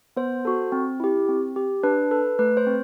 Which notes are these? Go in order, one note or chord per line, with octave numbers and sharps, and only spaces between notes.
B3 C5
F#4 A4
C4
E4 G4
C4
G4
D4 B4
A4 B4
A3 B4
C5
C4